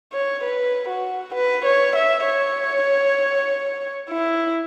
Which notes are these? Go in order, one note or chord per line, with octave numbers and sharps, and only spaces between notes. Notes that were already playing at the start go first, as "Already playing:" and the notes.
C#5
B4
F#4
B4
C#5
E5
C#5
E4